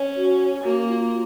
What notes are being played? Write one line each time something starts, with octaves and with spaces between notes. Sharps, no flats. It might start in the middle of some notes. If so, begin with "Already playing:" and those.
Already playing: C#4
F#4
A#3 F#4
F4